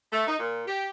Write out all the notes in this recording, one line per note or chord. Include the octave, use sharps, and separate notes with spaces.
A3
D#4
A#2
G4